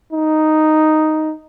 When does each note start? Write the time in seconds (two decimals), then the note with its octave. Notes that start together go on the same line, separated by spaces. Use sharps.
0.13 D#4